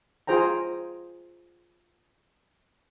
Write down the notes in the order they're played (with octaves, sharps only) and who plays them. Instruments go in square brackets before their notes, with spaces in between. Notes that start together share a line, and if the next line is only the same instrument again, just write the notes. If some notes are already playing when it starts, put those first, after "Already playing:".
[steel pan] F4 G#4 C5 G5 A#5